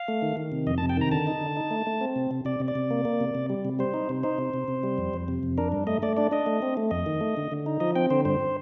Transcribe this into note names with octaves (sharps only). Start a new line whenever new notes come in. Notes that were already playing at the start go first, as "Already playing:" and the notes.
Already playing: F5
A3
D#3
D#3
C3
F2 D#5
A5
C3
G5
D#3 A#5
D3 A5
D#4
D3
D#4
A3
A3
C4
C3
C3
C3 D5
C3
D5
C3
A#3
A#3
C3
C3
G3
C3
G3 C5
D#4
C3
D#4 C5
C3
C3
C3
G3
F2
F2
C3
F2
D4 A#4
G2
A3 D#5
A3 D5
D4 D5
D4 D#5
A3
C4
A3
F2 D#5
D#3
A3
D3
D3
D#4
F3 D#5
C4 G5
D3 C5
G2 C5